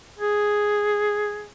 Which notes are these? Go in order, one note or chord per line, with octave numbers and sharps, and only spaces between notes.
G#4